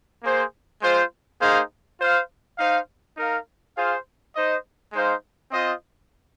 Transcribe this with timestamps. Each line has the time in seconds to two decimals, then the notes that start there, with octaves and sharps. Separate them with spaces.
0.23 A#3 G#4 C5
0.82 G#3 F4 C5
1.40 A#3 D#4 G#4 C5 F5
1.99 F4 C5 F5
2.58 D#4 C5 F5
3.17 D#4 A#4 F5
3.75 F4 G#4 C5 F5
4.35 D#4 C5 D#5
4.93 G#3 D#4 C5 F5
5.52 C4 F4 C5 D#5